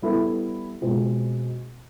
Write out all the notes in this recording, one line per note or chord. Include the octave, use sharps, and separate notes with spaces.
G3 B3 E4 A4
B2 G#3 C4 F4